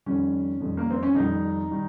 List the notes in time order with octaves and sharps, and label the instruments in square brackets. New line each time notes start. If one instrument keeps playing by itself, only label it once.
[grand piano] F2 D#3 G3 C#4
F2 D#3 G3
A#3
C4
C#4
F2 D#3 G3 D#4
D#3 G3